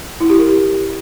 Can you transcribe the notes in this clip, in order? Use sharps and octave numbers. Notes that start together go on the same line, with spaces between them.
E4
G4
A#4